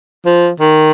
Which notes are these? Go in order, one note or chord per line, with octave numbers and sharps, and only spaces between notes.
F3
D#3